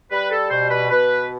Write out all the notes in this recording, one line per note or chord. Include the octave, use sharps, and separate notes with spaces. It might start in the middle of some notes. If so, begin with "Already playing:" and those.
G3 B4
A4
B2 C5
B4
B2 B4